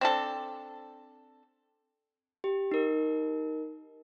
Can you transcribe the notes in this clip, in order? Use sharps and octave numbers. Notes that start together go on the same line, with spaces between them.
C4 D4 A4
G4
D#4 A#4